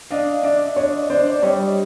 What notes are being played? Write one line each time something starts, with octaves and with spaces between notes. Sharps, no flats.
D4 D#5 F5
D4 D5 E5
D4 C#5 D#5
D4 C5 D5
D5
G3 C#5 D#5